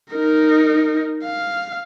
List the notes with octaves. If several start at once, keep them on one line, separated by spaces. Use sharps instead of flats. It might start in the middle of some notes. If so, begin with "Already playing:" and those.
D#4 A#4
F5